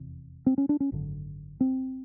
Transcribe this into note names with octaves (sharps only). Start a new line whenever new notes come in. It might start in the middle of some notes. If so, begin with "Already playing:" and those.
Already playing: F1 E2 C3
C4
C#4
D4
C#4
G#1 F#2 D3
C4